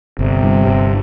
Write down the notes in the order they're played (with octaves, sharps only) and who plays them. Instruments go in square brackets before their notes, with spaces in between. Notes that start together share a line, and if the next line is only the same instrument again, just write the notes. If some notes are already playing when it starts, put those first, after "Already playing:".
[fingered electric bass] G1 [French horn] C3
[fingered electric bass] G2
G1